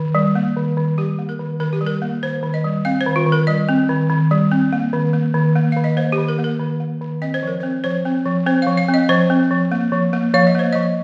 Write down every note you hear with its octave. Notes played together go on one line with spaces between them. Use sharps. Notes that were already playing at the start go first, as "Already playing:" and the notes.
Already playing: D#3
G3
A#3
D#3
D#3
G3 G4
A#3
A#4
D#3
D#3 A#4
G4
G3
A#4
A#3
D#3 C5
D#3
D#5
G3
C4 F5
C5
D#3
F4
D#3
A#4
G3 D#5
C4
D#3
D#3
G3
C4
A#3
D#3
A#3
D#3
A#3
D#3 F5
D#5
A#3 C5
D#3 G4
A#4
A#3
A#4
D#3
A#3
D#3
C4 D#5
C5
F3 A#4
C4 C5
F3 C5
C4
F3
C4 C5
F3 F5
F5
C4
D#5
F3 C5
C4
F3
A#3
F3
A#3
F3 F5
D#5
A#3 C5
F3 D#5